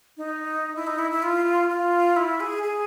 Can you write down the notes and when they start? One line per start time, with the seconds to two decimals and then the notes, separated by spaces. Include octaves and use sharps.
0.17 D#4
0.76 E4
0.87 D#4
0.99 E4
1.11 E4
1.23 F4
1.69 F4
2.16 E4
2.40 G#4
2.63 G#4